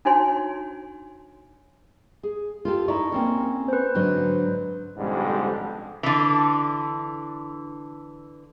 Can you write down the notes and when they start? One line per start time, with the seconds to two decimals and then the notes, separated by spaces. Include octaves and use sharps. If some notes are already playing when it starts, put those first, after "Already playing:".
0.05 D4 D#4 F#4 C#5 G#5 C6
2.23 G#4
2.65 F4 G4 A4
2.88 D#4 E4 D5 A#5 C#6
3.12 A#3 C4 C#4
3.68 B4 C5
3.95 G#2 D3 F#3
4.97 A1 F2 G#2 B2 D3 G3
6.03 D3 E3